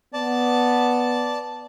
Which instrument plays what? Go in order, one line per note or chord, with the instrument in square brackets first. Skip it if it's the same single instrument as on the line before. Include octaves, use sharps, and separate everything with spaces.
[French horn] B3 [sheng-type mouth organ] D5 A5